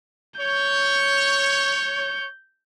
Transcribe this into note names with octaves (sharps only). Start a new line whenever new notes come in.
C#5 G6